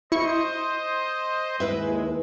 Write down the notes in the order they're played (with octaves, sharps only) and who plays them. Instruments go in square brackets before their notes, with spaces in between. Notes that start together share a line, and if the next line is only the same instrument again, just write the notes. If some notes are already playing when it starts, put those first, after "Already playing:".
[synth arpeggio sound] E4 C#6 [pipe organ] C5 D#5
[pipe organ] D#2 G#3 [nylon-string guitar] E4 B4 E5